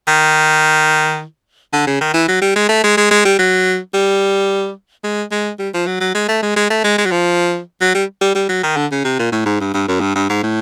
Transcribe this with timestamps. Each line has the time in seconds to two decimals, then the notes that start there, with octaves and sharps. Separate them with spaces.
0.08 D#3
1.73 D3
1.87 C#3
2.01 D#3
2.14 E3
2.28 F#3
2.42 G3
2.56 G#3
2.69 A3
2.84 G#3
2.97 G#3
3.11 G#3
3.25 G3
3.39 F#3
3.94 G3
5.04 G#3
5.31 G#3
5.59 G3
5.74 F3
5.87 F#3
6.00 F#3
6.15 G#3
6.28 A3
6.42 G#3
6.56 G#3
6.70 A3
6.84 G#3
6.98 G#3
7.05 F#3
7.11 F3
7.81 F#3
7.95 G3
8.21 G3
8.35 G3
8.49 F#3
8.63 D#3
8.77 D3
8.91 C#3
9.05 C3
9.19 A#2
9.32 A2
9.46 G#2
9.60 G2
9.74 G2
9.88 F#2
10.01 G2
10.15 G2
10.29 G#2
10.43 A2